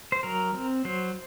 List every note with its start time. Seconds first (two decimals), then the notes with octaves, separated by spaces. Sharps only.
0.12 C5
0.23 F#3 A#4
0.54 C4
0.85 F#3 C5